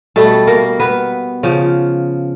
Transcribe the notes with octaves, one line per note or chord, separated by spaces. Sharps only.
B2 G3 A3 A4
A#3 A#4
B3 B4
C#3 F3